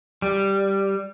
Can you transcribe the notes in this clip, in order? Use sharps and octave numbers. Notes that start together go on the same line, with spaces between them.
G3